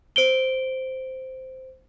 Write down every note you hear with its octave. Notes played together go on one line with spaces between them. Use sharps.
C5 D7 G7